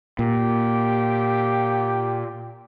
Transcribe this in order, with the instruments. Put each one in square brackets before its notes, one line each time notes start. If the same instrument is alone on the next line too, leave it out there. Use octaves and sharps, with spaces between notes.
[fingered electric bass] A#2 [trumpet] G4